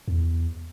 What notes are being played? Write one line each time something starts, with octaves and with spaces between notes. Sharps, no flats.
E2